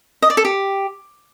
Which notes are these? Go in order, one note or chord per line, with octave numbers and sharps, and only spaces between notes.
D#5
D5
A4
G4